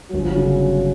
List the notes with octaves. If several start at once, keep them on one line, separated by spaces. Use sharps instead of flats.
G1 F#3
F3
F#3
C#3